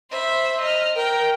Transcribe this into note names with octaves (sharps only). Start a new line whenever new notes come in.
C5 E5 B5
D#5 A#5 F6
A#4 G5